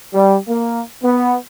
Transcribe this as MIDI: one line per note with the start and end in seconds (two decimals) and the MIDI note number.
0.14 0.37 55
0.48 0.82 58
1.03 1.34 59